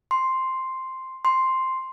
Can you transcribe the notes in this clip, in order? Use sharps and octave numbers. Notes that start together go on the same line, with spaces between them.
C6
C6